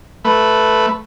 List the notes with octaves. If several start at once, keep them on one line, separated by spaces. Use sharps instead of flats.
A3 B4